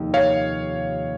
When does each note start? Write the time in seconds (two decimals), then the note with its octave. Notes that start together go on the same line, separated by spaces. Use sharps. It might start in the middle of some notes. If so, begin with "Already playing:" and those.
Already playing: F1 D#2 D#3
0.14 C#5 F5